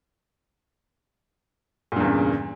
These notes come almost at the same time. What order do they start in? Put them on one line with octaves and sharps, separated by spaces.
A#2 G2 E2 C#3